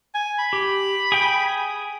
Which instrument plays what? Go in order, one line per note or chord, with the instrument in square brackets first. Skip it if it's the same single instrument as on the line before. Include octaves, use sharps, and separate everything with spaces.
[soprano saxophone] G#5
B5
[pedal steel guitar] G4
G#4 G5 G#5